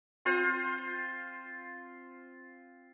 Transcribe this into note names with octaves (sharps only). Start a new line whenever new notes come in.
C4 F4 C5